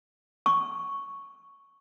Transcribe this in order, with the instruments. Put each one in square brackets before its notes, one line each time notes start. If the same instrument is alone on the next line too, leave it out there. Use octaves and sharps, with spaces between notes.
[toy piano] C#6